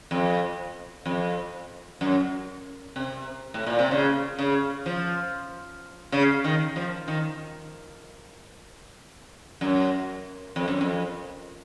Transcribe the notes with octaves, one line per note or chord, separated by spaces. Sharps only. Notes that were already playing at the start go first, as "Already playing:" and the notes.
F2
F2
F#2
C3
A2
A#2
C3
C#3
C#3
F3
C#3
D#3
F3
D#3
F#2
F2
F#2
F2